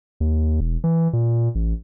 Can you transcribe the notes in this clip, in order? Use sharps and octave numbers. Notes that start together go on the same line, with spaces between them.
D#2
E1
E3
A#2
A1